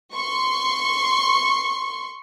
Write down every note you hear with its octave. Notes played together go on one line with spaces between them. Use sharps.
C6 C#6